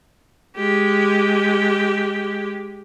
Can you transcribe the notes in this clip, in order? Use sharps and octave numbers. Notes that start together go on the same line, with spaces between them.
G#3 G4